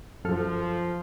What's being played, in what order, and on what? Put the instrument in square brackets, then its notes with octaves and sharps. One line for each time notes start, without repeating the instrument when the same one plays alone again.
[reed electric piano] F#2 A4 F6 [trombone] F3